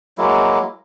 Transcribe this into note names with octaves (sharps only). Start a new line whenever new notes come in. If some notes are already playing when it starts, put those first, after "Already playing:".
F#3 G#3 A#3 E4